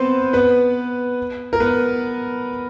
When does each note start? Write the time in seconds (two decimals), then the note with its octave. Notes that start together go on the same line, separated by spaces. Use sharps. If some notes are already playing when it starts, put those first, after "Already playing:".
Already playing: B3 C4 B4 C5
0.33 B3 B4
1.53 A#4
1.60 B3 B4